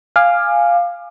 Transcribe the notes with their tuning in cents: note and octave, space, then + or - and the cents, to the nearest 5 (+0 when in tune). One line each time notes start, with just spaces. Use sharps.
F5 +0 G#5 -10 D6 +30